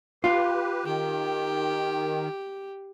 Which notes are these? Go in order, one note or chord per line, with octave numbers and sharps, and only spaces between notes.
F4 G4 B4
D#3 G4